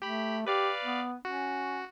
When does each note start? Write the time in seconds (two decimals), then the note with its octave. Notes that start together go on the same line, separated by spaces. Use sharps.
0.02 A3 G4 B5
0.47 G4 B4 D5 F5
0.84 B3
1.25 C#4 F#4